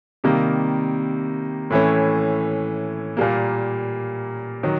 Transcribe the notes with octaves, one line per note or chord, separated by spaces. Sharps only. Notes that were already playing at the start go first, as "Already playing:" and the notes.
C3 D#3 G3 A#3
A2 E3 A3 C#4
A#2 G3 A#3
D#3 F#3